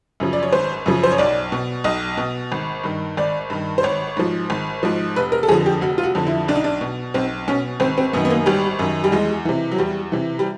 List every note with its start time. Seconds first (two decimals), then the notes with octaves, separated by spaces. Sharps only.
0.20 F#2 C#3 F3
0.33 D5
0.43 C#5
0.52 G#1 C5
0.86 F#2 C#3 F3
1.03 C5
1.12 C#5
1.18 B1 D5
1.52 B2
1.84 B1 D#5
2.17 B2
2.52 G#1
2.84 G2 D#3
3.17 G#1 D5
3.50 G2 D#3
3.78 C5
3.83 G#1 C#5
4.17 G#2 F3
4.50 G#1
4.83 G#2 F3
5.16 F1 B4
5.32 A#4
5.43 A4
5.49 F2 D3 F3 G#4
5.66 G4
5.81 F1 F#4
5.98 F4
6.03 F#4
6.15 F2 D3 F3
6.27 E4
6.48 B1 D4
6.56 D#4
6.64 D4
6.81 B2
7.14 B1 C4
7.48 B2 C#4
7.80 G#1 C4
7.98 C4
8.13 F#2 D#3 B3
8.25 B3
8.30 A#3
8.46 G#1 G3
8.79 F#2 D#3
9.04 G3
9.12 E2 G#3
9.45 C3 E3
9.72 F#3
9.78 E2 G3
10.12 C3 E3
10.39 G3